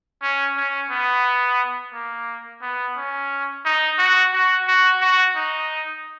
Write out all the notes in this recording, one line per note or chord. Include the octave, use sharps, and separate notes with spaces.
C#4
C#4
B3
A#3
B3
C#4
D#4
F#4
F#4
F#4
F#4
D#4